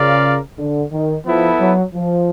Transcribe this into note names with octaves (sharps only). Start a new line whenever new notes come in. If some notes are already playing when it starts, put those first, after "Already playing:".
Already playing: C#3 F4 A#4 D5 F5
D3
D#3
F3 B3 E4 A4
F#3
F3